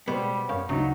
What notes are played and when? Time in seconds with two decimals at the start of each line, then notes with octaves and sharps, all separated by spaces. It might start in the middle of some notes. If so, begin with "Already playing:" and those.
0.08 B2 G3 G#3 B3 G4 C5
0.49 F#2 C#5 F5
0.69 D2 C#3 F#3 D4 D#4